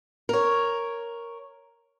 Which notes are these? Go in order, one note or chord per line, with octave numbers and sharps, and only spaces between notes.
A#4 C#5